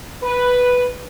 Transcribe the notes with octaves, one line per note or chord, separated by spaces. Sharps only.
B4